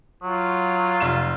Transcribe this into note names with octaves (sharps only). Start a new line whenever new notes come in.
F#3 F4
F1 E7